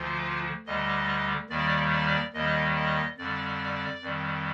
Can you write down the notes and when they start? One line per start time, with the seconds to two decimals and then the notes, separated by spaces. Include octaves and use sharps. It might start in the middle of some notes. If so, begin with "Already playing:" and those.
Already playing: D2 D3 F3 F4
0.66 D2 D3 G3 D#5
1.49 D#2 D#3 G3 D5
1.93 D5
2.33 D#2 D#3 G3 D#5
2.76 D#5
3.18 F2 D3 G3 D5
4.02 F2 D#3 G3